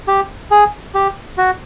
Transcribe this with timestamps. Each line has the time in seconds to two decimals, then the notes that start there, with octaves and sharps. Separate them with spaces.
0.08 G4
0.51 G#4
0.95 G4
1.38 F#4